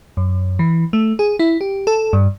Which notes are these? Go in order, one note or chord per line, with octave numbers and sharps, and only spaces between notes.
F#2
E3
A3
G#4
E4
G4
A4
G2